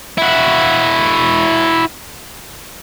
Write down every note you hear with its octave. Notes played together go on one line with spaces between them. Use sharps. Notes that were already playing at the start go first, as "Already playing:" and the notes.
E4 F#4